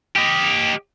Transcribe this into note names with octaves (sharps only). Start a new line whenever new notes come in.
G4 D#5